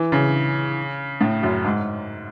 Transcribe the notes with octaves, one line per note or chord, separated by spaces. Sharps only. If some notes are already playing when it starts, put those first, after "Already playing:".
Already playing: E3
C#3
A2
F#2
G#2